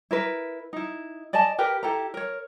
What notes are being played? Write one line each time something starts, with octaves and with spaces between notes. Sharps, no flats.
E4 A#4 B4
D#4 E4
D5 D#5 G#5 A5
G4 A#4 B4
E4 G4 A4 A#5
A#4 C#5